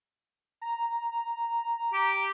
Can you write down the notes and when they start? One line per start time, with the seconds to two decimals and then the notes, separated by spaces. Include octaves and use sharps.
0.62 A#5
1.93 G4